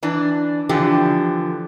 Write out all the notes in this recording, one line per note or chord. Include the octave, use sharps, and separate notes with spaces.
E3 D4
D3 E3 F3 G4